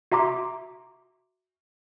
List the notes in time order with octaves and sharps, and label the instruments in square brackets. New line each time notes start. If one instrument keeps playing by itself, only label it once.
[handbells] F#4 E5 A#5 C6 D6